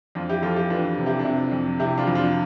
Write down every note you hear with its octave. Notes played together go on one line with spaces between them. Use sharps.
F2 D4 F4
E4 G4
F2 F4 A4
E4 G4
E3 D4 F4
C3
E4 G4
D4
C3 E4
F2
C3 E4 G4
D4 F4
F2
D4 F4